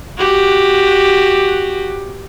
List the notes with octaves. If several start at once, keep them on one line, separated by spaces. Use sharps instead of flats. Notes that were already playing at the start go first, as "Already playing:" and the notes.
F#4 G4